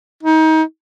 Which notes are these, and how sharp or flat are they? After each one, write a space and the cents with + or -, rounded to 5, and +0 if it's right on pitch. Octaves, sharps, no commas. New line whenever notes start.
D#4 +30